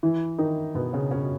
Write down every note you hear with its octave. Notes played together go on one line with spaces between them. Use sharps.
E3 E4
D#3 D#4
B2 B3
C#3 C#4
C#3 C#4